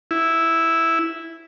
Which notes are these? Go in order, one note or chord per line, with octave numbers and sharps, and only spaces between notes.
E4